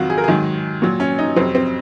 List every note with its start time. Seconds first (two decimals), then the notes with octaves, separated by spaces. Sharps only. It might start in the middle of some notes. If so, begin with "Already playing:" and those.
Already playing: F2 C3 D#3 F#3 F4 F#4
0.10 G#4
0.18 A#4
0.24 G#2 D#3 F#3 G#4
0.82 A#2 F#3
1.00 C#4
1.19 D#4
1.36 F2 C3 F#3 C4
1.55 C4